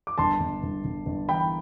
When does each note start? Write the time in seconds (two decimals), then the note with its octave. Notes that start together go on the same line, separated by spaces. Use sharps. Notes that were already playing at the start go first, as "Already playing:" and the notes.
0.07 D6
0.18 G1 A5 C6
0.40 G1
0.63 G1
0.84 G1
1.06 G1
1.29 E3 G5 B5